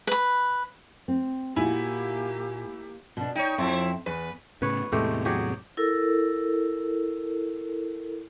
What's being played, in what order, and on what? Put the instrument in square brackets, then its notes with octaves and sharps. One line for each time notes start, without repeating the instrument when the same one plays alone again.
[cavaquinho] B4 B5
[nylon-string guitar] C4
[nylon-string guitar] A#2 F#4 [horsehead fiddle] A#3 G4 [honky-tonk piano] E4 G#5
[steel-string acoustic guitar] B2 D4
[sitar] D#4 C#5 [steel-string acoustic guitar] G5
[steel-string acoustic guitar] F2 C4 E5 [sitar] F3 E4
[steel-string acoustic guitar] E2 [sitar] B4
[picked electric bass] A2 C#3 [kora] B4 C#5
[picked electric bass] E2 A2 C3 [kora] G#3 A3 G4
[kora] F#3 G4 G#4
[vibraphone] E4 A4 A#4